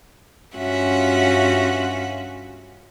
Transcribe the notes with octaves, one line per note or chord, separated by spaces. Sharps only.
G2 C#4 F4 F#4 E5 F#5